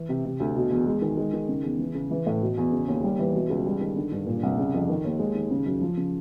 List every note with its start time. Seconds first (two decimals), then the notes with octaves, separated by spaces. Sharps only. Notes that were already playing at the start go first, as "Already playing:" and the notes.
Already playing: E3
0.09 C3
0.25 C3
0.40 D2
0.56 B2
0.71 E2
0.87 G#3
1.02 D#3
1.17 G#3
1.33 D#3
1.49 C#3
1.63 E2
1.79 E3
1.95 C#3
2.11 E3
2.26 A2
2.42 B2
2.57 E2
2.72 C#3
2.88 D#2
3.04 G3
3.19 E3
3.35 B2
3.49 C#2
3.65 G3
3.81 D#3
3.96 D3
4.12 G2
4.26 A#2
4.43 C2
4.58 C#3
4.74 F2
4.89 D#3
5.05 D#2
5.19 G#3
5.35 D#3
5.51 C#3
5.66 F#2
5.81 F3
5.97 C#3